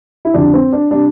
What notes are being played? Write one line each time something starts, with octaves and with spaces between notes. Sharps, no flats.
E4
F2 D3 G3 D4
C4
D4
C3 G3 D4